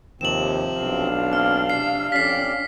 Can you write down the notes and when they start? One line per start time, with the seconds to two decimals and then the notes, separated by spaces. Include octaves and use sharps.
0.21 D#2 C3 F3 C4 E7 F#7
0.80 B1 D4 F5
1.33 A#3 C4 F6
1.70 C3 E6 C7
2.12 F2 C#4 G4 D5 B6 C7